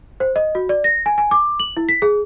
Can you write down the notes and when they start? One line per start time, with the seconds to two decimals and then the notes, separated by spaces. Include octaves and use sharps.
0.20 C5
0.36 D#5
0.55 F#4
0.69 D5
0.84 A#6
1.06 G#5
1.18 G#5
1.31 D6
1.60 F#7
1.77 E4
1.89 B6
2.02 G#4